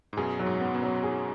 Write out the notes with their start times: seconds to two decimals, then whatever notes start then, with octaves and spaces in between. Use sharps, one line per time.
0.13 G#2
0.17 F#2 B2 G#4
0.39 F#2 F#3
0.46 G#2
0.61 B3
0.74 F#2 B2
0.82 F#3
1.03 G#4